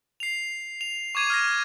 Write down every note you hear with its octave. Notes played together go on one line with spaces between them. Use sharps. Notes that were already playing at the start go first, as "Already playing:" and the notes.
C7 F7
F7
C#6 D6 G#6 D#7 F7
F6 G#6 A#6